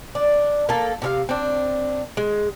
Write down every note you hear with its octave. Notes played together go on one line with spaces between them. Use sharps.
D4
A#3 A4
C3 A4 F5
C4 D4
G#3